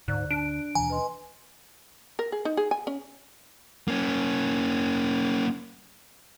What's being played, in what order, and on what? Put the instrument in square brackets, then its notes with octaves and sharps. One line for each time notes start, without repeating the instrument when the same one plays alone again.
[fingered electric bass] D2 D3 [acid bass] G#2 [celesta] D5 F#6
[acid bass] D4 [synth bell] D7
[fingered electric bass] D#2 B2 E3 [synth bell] G#5 [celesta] A#5
[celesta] B4 D#5 C6
[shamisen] A#4
G#4
D#4
G#4
G#5
C#4
[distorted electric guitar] A#3 C#4